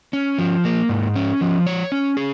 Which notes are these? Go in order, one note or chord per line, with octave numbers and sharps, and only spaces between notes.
C#4
F3
A#3
G#2
C#4
F3
C#5
C#4
G#4